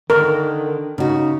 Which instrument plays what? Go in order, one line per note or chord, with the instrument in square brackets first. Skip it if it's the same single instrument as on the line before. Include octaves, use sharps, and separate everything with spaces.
[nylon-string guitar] D3 [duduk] D#3 [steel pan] A#4
[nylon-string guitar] C#3 F#4 [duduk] D#4